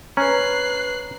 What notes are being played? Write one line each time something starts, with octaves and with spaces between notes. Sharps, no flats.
C#4 B4 A#5 F#6 C7